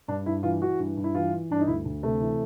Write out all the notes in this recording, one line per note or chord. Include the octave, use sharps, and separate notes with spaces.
G2 D4
G2 E4
E3 F4
E3 F#4
G2
G2
E4
E3 F4
E3
G2 D4
D#4
D2 E4
D2
C3 A3
E3